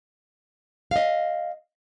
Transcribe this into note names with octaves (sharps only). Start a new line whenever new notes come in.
D#5 F5